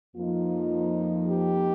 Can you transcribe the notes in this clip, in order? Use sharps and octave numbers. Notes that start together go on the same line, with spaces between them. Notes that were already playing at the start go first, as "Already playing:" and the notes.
F2 F3 A#3 D#4 F4
G4